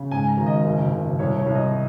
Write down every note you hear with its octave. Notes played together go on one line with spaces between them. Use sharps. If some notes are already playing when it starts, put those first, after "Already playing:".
Already playing: C#3
G#2 G#5
A#5
G#1
D#5
F#1
F#1
C2 C#5
C#5
C2
D#5